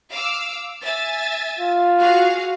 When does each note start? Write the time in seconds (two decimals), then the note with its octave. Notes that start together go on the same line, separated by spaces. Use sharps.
0.10 F5 D6 E6
0.83 E5 G#5 A6
1.59 F4
2.00 F#4 G#4 F5